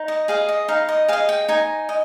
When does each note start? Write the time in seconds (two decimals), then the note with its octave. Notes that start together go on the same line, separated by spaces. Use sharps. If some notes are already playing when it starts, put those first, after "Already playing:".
Already playing: D#4
0.08 D#5
0.28 G#4 D#5 F5
0.49 D#5
0.68 D#4 F5
0.89 D#5
1.08 G#4 D#5 F5
1.29 G5
1.49 D#4 G#5
1.89 D#5